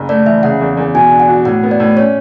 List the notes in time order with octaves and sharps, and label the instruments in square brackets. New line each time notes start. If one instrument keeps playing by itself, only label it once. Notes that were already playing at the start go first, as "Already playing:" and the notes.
Already playing: [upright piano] F#1
[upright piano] A3 [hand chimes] D5
[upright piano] E3 [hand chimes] E5
[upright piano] C#3 [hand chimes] F#5
[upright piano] E2
E2
[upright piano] B2 [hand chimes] G#5
[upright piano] D4
[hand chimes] F#5
[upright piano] F#4
[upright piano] A2 [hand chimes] F#5
[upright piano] B3
[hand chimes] D5
[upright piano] A2
[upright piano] C#4 [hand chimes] C#5